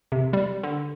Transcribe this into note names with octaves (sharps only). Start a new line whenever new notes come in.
C3
G3
D3